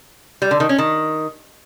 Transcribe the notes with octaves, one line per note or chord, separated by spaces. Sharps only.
G3
D3
D#3
C#4
D#3